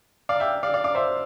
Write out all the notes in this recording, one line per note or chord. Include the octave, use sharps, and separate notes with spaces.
D5 F5
E5 G5
D5 F5
D5 F5
D5 F5
C5 E5